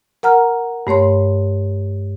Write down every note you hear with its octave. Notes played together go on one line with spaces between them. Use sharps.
A#4 F#5 A#5 F6
G2 A3 C#5 C6